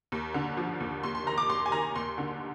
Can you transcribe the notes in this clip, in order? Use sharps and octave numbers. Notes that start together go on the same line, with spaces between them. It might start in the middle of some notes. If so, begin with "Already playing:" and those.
D#2
D3
F3
D#2
D#2 C6
C6
D#3 A#5
D6
D#2 C6
G#5
D#3 A#5
D#2 C6
D3